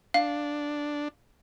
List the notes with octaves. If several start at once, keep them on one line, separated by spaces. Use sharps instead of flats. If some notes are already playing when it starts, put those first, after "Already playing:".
D4 F5